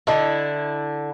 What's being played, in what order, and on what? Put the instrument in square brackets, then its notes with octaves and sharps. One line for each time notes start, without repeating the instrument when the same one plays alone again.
[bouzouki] D3 E4 [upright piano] D#5